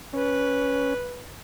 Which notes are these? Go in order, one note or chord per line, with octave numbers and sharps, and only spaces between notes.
C#4 B4